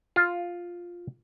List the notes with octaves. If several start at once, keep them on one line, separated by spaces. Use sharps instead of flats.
F4